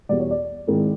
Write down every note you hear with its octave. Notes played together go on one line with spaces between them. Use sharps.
E2 B2 G3 B3 D5
C#5
D5
G#2 D#3 G#3 C4 E4